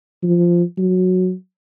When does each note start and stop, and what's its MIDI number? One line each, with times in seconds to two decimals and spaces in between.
0.23 0.62 53
0.77 1.33 54